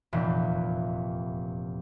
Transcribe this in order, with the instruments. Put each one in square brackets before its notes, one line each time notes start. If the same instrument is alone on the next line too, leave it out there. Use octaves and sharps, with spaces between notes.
[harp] F1 E2 A#2 E3